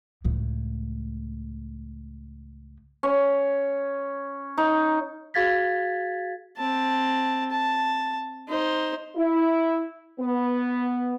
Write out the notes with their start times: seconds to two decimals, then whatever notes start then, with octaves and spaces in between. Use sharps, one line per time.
0.24 C#2 A2
3.03 C#4
4.57 D#4
5.34 F#4 G#4 F5 G#6 A6 B6
6.57 C4 A5
7.51 A5
8.49 D#4 C5
9.16 E4
10.20 B3